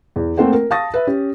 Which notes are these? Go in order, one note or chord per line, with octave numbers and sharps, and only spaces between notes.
E2
A3 A#3 C4 C5 F#5 G5
A#4
F5 A5 C#6 D#6 A6 A#6
B4 E5
C#4 G4